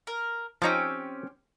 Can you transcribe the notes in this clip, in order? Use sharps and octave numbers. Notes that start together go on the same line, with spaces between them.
A#4
F3 C4 C#4 D#4 G4